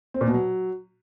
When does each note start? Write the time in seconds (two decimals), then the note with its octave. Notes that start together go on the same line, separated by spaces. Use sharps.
0.14 C4
0.21 A#2
0.27 B2
0.34 F#3